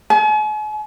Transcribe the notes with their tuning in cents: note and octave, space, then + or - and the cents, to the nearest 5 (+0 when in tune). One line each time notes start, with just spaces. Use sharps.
G#5 +45